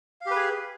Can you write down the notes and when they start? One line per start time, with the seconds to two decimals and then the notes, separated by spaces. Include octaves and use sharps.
0.21 F5
0.26 G4
0.31 B4
0.36 G#4